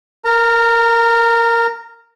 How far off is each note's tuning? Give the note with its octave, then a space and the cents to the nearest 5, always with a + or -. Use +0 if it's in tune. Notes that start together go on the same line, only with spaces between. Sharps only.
A#4 -5 A#5 -35